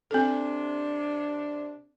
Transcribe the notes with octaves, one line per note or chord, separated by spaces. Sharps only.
C3 C4 D4 A4